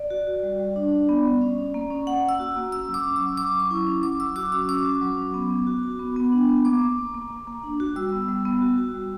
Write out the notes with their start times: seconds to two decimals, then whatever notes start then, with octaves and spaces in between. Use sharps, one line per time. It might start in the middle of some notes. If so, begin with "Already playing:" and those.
Already playing: D5
0.10 F#4
0.27 F#4
0.43 G3
0.59 G3
0.76 D4
0.92 D4
1.09 B3
1.26 G3
1.41 C#4
1.58 C#4
1.74 A#3
1.91 C#4
2.06 A#3 F#5
2.23 C#4
2.29 E6
2.40 F#4
2.56 A#3
2.72 C#4 E6
2.89 F#3
2.94 D6
3.05 C#4
3.16 E6
3.21 F#3
3.37 F#3 D6
3.55 C#4 C#6
3.71 E4
3.87 C#4
4.03 F#3 D6
4.20 F#3 E6
4.36 F#4 D6
4.52 C#4 E6
4.69 C#4 D6
4.85 F#4
5.01 F#3
5.17 C#4
5.34 B3
5.51 B3
5.67 F#4
5.83 F#4
5.99 B3
6.16 B3
6.32 D4
6.49 B3
6.65 A#3 D6
6.81 A#3
6.98 A#3
7.14 A#3
7.31 A#3
7.47 A#3
7.63 D4
7.80 F#4
7.96 G3 E6
8.12 B3
8.29 G3
8.45 B3
8.62 F#4
8.78 F#4
8.95 G3